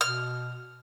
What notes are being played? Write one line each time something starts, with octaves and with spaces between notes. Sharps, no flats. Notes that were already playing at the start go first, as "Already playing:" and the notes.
B2 F6